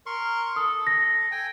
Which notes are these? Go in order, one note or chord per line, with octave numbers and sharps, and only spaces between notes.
A#4 C6 C#6
A4 D#6
A#6
G5 G#5